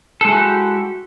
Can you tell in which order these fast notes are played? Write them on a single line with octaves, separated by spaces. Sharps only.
A4 G#3 E4 F#4 G4